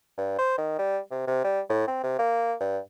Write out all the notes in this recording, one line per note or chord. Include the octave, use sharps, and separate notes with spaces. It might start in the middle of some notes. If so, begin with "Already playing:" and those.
G2
C5
D#3
G3
C3
C3
G3
A2
C4
C3
A#3
G2